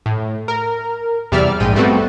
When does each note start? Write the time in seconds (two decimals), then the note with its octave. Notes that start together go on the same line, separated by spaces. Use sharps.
0.06 A2
0.48 A#4
1.32 E2 C3 G3 D5 E5 F6
1.60 A#1 G#2 G5 D#7
1.75 G3 A3 B3 C4 F#4 A4